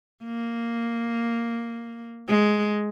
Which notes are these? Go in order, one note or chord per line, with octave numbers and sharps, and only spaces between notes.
A#3
G#3